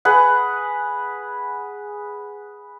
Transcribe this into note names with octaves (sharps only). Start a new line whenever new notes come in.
G#4 B4 F#5